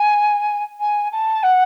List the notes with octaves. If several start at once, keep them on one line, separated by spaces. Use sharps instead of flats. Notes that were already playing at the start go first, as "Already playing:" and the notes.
Already playing: G#5
G#5
A5
F#5